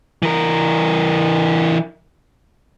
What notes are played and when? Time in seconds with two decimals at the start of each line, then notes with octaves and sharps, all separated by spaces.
0.23 E3 A#4